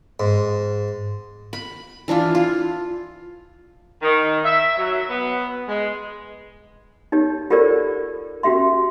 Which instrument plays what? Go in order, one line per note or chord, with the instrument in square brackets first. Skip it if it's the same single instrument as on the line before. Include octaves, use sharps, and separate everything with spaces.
[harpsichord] G#2
[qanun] B5
E3 D4 E4 F4
F4
[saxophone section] D#3
E5
F#3
B3
G#3
[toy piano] D#4 G4 C#5
F4 G4 A4 A#4 C5 D5
C#4 F#4 G4 E5 C6